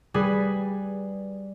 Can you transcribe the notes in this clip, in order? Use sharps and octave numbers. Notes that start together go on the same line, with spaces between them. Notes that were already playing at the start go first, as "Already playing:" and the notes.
G3 G#4 B4